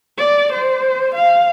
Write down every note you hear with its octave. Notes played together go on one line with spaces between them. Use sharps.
D5
C5
F5